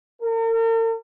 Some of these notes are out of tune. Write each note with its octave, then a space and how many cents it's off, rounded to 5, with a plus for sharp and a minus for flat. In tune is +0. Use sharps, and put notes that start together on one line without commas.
A#4 -45